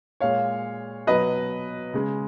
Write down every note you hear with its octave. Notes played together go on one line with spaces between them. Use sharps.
A#2 G#3 C#5 F5
B2 F#3 B4 D#5
C#3 G#3